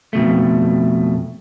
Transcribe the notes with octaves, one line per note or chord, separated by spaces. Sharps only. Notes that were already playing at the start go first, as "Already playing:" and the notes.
F2 B2 A3